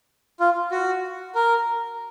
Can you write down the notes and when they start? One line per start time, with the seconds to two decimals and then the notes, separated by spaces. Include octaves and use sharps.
0.40 F4
0.71 F#4
1.35 A#4